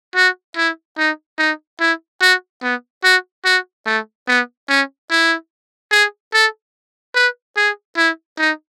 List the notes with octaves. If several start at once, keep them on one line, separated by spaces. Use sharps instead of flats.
F#4
E4
D#4
D#4
E4
F#4
B3
F#4
F#4
A3
B3
C#4
E4
G#4
A4
B4
G#4
E4
D#4